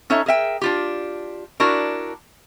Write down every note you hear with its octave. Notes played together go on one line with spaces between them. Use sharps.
C#4 D#4 A4 C#5 E5
G#4 A#4 E5 G5
D4 F4 G4
D4 E4 F#4 A#4 D5